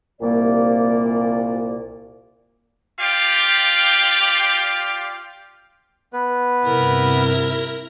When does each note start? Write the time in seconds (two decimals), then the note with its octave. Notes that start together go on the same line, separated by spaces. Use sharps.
0.21 C2 A#2 A#3 D5
3.00 F4 G4 D5 F5 G5
6.13 B3 B4
6.65 G2 C3 E4 A#4